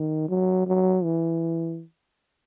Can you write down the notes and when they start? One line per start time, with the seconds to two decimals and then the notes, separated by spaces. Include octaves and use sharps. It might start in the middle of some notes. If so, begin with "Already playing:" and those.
Already playing: D#3
0.29 F#3
0.67 F#3
1.04 E3